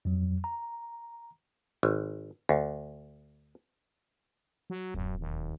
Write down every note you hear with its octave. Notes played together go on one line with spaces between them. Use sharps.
F2 F#3
A#5
G#1
D2
F#3
D1 F#2
D#2